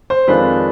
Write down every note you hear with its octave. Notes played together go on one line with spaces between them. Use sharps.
C5
F2 D#3 G#3 D4 F4 B4